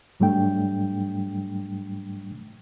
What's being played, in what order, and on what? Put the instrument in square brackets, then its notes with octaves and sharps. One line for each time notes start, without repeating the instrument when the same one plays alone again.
[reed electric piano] G#2 F#3 G3 A3 D4 G5